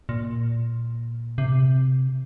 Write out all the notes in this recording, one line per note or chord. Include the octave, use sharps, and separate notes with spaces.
A#2
C3